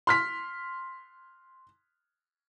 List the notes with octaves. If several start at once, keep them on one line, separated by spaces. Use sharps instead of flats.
C6 F6 B6